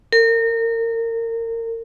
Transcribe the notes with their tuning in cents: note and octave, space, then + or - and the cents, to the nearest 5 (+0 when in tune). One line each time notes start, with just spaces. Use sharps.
A#4 -30